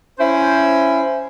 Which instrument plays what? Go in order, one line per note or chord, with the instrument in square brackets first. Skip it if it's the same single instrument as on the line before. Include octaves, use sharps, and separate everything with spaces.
[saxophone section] C#4 E4 C5